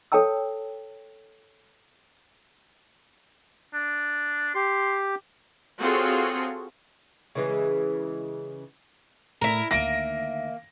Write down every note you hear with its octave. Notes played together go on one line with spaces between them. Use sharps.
A4 C#5 G5 A5 E6
D4
G4 C6
C4 F4 F#4 G#4 A4 C#5
C#3 E3 G#3
A2 E4 A#4
D2 D#3 A#3 E5 A#6 D7